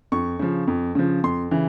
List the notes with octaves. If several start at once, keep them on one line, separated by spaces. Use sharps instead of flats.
F2 C#6
C#3 F3
F2
C#3 F3
F2 C6
C#3 E3